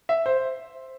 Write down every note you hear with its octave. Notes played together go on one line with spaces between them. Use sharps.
E5
C5